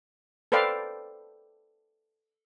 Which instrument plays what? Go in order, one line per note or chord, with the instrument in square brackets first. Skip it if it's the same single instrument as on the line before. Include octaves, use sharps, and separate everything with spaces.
[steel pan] A4 B4 C5 D5 F5 G5